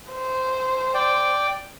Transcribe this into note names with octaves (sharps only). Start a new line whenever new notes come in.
C5
D5 G5